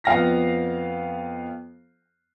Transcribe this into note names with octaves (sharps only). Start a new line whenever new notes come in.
F2 B3 F5 F6 A#6 B6